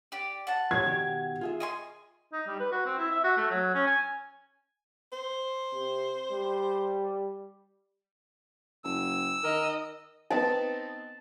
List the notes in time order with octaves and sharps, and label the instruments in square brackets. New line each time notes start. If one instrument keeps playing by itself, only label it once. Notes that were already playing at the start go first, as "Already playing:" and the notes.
[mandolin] G4 D5
F#5 A5
[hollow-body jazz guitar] F3 G3 C#5 [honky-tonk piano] G#6
[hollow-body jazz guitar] B2 D#3 G4
F4 G#4 E5
[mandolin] D#5 G#5 C6
[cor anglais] D#4
G3
B4
F#4
C4
E4
E5
F#4
A3
F#3
C#4
G#5
[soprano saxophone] C5
[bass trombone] C3
G3
[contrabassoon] F#1 [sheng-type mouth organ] E6
[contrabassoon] D#3 [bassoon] A#4 [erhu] D#5
[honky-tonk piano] B3 C4 D#4 [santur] A5